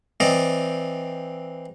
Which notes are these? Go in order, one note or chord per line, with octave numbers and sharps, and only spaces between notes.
E3 C4 D5 D#5